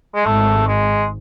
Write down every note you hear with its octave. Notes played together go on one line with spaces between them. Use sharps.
G#3
G#1 G#2 A3
G#3